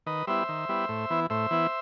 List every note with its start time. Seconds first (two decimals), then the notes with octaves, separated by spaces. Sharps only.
0.06 D#3 B4 D#5
0.27 G3 B3 E4 C5 E5
0.49 D#3
0.69 G3 B3 E4
0.89 A2
1.10 E3 B3 E4
1.30 A2 C5 E5
1.51 E3 B3 E4